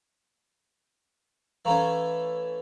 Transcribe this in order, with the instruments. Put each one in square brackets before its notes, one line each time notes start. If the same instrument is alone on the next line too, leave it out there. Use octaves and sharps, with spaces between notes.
[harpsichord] E3 A3 C#4 [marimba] F5 A#5 C#6